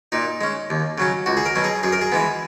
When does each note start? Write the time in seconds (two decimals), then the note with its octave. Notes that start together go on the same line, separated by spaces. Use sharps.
0.12 A#2 D#4
0.41 G#3 C#4
0.70 D#2
0.98 C#3 F#3 C#4
1.26 C#2 F#4
1.37 G#4
1.45 A#4
1.55 B2 F#3 C#4
1.64 G#4
1.83 F#2 G#4
1.92 A#4
2.01 G#4
2.12 E3 G#3 B3